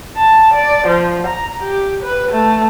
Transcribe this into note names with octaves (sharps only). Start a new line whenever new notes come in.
A5
D5
F3
A#5
G4
B4
A3